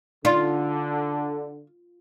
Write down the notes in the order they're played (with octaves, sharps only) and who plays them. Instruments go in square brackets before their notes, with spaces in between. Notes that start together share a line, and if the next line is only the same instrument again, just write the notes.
[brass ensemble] D3 [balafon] D#4 D5 C6 [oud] F4